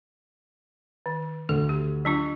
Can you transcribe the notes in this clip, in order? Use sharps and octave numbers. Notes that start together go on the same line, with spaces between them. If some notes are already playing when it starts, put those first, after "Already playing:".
D#3
D2 A4
G4
F#3 D4 F4